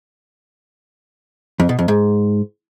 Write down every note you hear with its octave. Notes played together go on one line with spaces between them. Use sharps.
F2
B2
F2
G#2